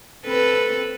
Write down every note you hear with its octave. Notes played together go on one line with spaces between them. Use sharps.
C4 A4 B4